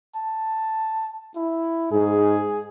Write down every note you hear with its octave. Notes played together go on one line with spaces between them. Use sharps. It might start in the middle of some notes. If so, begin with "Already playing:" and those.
A5
E4
G#2 G#4